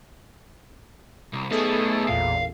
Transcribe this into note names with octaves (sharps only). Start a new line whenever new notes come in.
C2
A3 B3 D#4 G#4 A4
A1 E2 A#2 F5